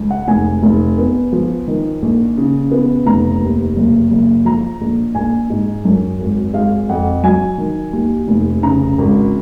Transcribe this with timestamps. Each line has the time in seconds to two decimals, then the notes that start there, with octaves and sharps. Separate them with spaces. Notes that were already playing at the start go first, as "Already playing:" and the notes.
Already playing: C#2 G#3
0.10 F#5
0.28 F1 G#5
0.63 F1
0.98 B3
1.33 F3
1.67 D#3
2.02 A#1
2.37 C#3
2.71 B3
3.06 F1 A#5
3.41 D#2
3.76 F#1
4.11 F#1
4.45 F3 A#5
4.81 A#1
5.15 A#1 G#5
5.50 G#2
5.85 F#2
6.20 G#1
6.54 G#3 F5
6.89 F2 F#5
7.23 F#3 G#5
7.58 D#3
7.93 D#2
8.28 F1
8.63 C#3 A#5
8.98 G#1